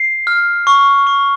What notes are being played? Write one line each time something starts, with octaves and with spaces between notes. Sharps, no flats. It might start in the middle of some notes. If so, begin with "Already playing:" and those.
Already playing: C7
F6
C#6
C#6